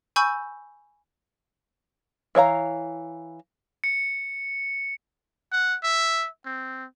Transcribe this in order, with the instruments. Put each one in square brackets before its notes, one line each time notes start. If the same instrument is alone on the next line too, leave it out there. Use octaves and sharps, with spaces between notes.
[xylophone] G#5 B5 C#6 E6 G6
[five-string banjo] E3 C#5 F5 A#5
[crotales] C#7
[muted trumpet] F#5
E5
C4